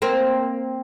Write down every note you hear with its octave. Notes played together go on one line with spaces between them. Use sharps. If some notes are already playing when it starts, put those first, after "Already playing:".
A#3 C4